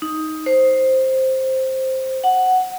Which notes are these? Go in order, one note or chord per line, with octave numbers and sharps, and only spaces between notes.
D#4
C5
F#5